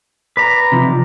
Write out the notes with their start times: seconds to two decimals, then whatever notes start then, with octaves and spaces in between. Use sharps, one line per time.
0.37 B4 D5 A#5
0.72 C3 F3